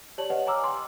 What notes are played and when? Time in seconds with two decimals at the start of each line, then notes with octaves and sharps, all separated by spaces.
0.18 G4 C#5 D5 A5 F#7
0.30 G4 B4 C#5 D#5 F#5
0.47 G#5 A#5 D6 E6 F6
0.64 G5 C6